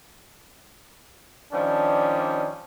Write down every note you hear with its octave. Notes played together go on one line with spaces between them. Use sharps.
D#3 F3 G3 C#4 D4